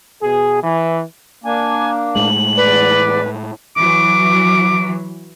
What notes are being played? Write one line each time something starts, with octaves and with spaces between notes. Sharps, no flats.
B2 G#4
E3
A#3 D4 G#5
A2 G#3 F#7
E2 B4 D5
E3 F#3 D6